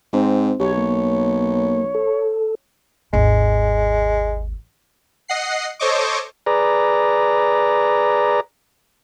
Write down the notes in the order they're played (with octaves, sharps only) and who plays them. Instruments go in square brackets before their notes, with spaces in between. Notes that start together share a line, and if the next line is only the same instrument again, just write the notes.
[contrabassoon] G#2 [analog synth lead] C4
[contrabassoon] B1 [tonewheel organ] G4 [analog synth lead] C#5
[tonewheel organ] A#3
A4
[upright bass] G#1 D#2 [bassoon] G#3
[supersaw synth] D#5 F#5 C7
A4 C5 C#5 D#5 C#6 D6
[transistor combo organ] G#4 B4 D5 A#5